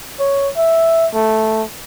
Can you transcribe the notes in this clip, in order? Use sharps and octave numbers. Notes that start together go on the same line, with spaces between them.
C#5
E5
A3